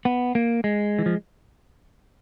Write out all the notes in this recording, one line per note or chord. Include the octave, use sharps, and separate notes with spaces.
B3
A#3
G#3
E3
F3